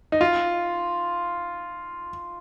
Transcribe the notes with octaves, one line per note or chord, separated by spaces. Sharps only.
D#4
F4